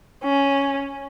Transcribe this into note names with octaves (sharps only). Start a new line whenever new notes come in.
C#4